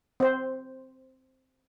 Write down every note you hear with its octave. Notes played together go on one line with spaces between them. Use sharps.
C4 C5